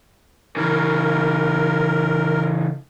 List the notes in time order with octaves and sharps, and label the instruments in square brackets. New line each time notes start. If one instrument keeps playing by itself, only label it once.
[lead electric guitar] C#3 E3 [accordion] A#4